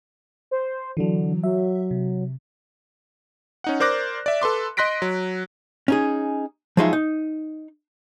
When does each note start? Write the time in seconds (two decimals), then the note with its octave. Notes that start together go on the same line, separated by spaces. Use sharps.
0.51 C5
0.97 D3 E3 F#3
1.44 F#3 E5
1.91 C3
3.64 C#4 D#4 F#5
3.80 A#4 C5 D5 D6 F#6 A#6
4.26 D5 E5
4.42 A4 B4 C6 D6
4.77 D#5 C6 F#6 A#6 B6 D7
5.02 F#3
5.88 C#4 D#4 G#4
6.77 F3 F#3 G#3 D#4 F4 E5
6.93 D#4